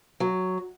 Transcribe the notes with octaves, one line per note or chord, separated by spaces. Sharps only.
F#3